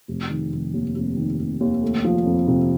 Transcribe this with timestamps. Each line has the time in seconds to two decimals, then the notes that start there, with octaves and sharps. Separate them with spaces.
0.08 F1
0.31 D#3
0.52 F1
0.74 D#2
0.96 F1
1.17 D#3
1.39 F1
1.61 D#2
1.82 A3
2.04 F3
2.26 F2
2.48 C3